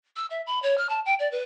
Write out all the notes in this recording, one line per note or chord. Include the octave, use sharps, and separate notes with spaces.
E6
E5
B5
C#5
F6
A5
G5
D5
B4